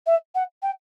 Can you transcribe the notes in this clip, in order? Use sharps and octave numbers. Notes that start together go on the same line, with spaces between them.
E5
F#5
G5